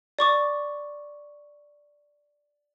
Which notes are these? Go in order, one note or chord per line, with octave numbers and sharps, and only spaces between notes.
D5 C#6 D6